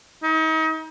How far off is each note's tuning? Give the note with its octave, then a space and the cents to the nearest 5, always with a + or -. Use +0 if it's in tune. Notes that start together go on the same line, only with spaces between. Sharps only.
D#4 +35